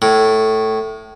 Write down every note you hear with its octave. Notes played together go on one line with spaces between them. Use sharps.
A2